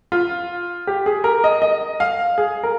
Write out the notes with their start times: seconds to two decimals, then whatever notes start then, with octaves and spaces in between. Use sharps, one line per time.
0.12 F4
0.87 G4
1.06 G#4
1.24 A#4
1.44 D#5
1.62 D#5
2.00 F5
2.38 G#4
2.63 A#4